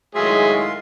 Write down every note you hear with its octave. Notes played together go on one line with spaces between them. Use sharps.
A2 D#3 F#3 G#3 F4 G#4 E5 C6